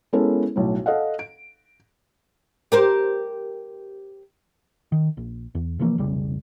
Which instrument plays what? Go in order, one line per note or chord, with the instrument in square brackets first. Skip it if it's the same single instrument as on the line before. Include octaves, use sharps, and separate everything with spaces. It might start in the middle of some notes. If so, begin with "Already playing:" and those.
[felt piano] G#3 B3 C#4 E4 A4 A#4
B1 A2
A4 D#5 F5 F#5
D7
[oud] G4 A#4 C5
[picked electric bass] D#3
A#1
E2
C3 E3 F3 A#3
F1 B1 C#3 G3